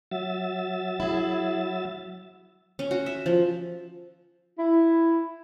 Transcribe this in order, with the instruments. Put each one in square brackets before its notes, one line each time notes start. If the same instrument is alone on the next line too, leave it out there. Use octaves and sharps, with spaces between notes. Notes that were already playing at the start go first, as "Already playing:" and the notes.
[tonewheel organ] F#3 E5 A6
[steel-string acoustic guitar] E4 G#4
[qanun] C#4
F#4
E5
F3
[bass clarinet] E4